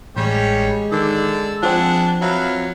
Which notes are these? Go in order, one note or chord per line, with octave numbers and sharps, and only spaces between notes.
A1 G3 G#3 C#4 G4 C#5
D3 D#3 D5 E6
F3 C4 D4 G#4 F#5
F#3 B4 E5 F5